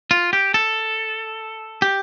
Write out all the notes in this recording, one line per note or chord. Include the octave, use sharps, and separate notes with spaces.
F4
G4
A4
G4